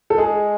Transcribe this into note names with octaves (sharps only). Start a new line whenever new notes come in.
A4
G#3 G#4